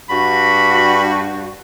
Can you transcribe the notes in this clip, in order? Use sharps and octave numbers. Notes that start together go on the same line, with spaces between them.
G2 F#4 B5